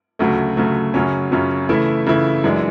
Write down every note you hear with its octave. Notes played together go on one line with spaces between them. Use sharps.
D2 C#3 F#3 A3
D2 C#3 F#3 A3
F#2 C#3 F#3 C#4
F#2 C#3 F#3 C#4
C#3 E3 A3 E4
C#3 E3 A3 E4
F#2 E3 G#3 D4